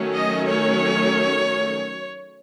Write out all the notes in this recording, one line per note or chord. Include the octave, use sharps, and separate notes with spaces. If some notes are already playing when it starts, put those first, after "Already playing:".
Already playing: D#3 F#3 A3 C#4
D#5
C#5